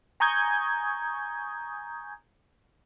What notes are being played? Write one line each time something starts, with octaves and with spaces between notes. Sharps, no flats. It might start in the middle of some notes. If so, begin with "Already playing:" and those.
G#5 A#5 C#6 D#6 G6 G#6